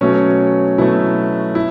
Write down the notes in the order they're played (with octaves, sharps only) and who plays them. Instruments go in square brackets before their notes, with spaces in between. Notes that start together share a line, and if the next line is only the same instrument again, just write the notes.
[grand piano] B2 F#3 A3 C#4
B2 F#3 A3 E4
E4